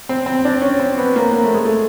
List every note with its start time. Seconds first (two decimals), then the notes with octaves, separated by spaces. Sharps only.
0.09 C4
0.26 C4
0.45 D4
0.62 C#4
0.80 C4
0.97 B3
1.16 A#3
1.32 A#3
1.44 A3
1.54 G#3
1.65 A3